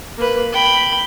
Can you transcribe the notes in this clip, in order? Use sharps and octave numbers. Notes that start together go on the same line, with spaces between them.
A#3 B4
G5 B5